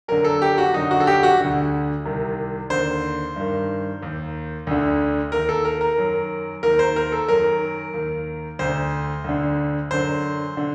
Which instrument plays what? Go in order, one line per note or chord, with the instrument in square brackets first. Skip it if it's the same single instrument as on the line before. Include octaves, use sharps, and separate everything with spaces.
[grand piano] F#2 D3 A#4
A4
G4
F#4
F#2 D3 D#4
F#4
A4
G4
F#4
D2 D3
C2 C3 D#3
D#2 D3 C5
G2 D#3
D#2 D#3
D2 D3
D#2 D#3 A#4
A4
A#4
A#4
F#2 D#3
D#2 D#3 A#4
C5
A#4
A4
F#2 D#3 A#4
D#2 D#3
D2 D3 C5
D2 D3
F#2 D3 C5
D3